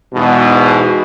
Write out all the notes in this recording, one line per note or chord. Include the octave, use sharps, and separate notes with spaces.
E2 G#2 B2